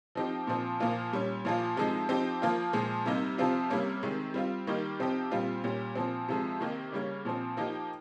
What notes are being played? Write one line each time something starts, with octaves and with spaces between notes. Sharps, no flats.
F3 C4 D#4 G4
A#2 F3 C4
A#2 F3 A#3 F4
A#2 G3 C#4
A#2 F3 A#3 F4
C3 F3 G#3 D#4
F3 C4 D#4 G4
F3 A#3 F4
A#2 F3 G#3
C3 G3 A#3 D#4
C3 F3 C4 F4
C3 G3 A#3 C#4
C3 D#3 G#3
G3 C4 F4
D#3 G3 A#3 D#4 G4
C3 F3 C4 D#4 G4
A#2 G3 C4 F4
A#2 G3 C#4 G4
A#2 F3 C4
C3 F3 G#3
C3 D#3 A#3 D#4 G4
C#3 G3 A#3 C#4
A#2 F3 C4
F3 A#3 D#4 G4